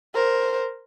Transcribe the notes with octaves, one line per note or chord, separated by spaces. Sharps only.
A#4 C5